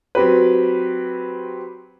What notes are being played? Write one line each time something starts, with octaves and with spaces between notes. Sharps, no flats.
F#3 C4 G4 B4